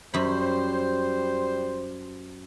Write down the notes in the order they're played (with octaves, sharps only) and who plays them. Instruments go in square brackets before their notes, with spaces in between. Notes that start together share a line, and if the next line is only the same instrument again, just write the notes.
[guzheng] F#2 B5 [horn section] G3 C5